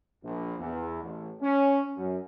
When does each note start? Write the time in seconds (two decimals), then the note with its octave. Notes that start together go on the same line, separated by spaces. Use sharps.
0.23 A#1
0.59 E2
1.02 A1
1.41 C#4
1.97 F#2